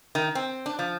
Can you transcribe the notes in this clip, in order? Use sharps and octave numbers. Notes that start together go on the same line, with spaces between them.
D#3
C4
D4
F3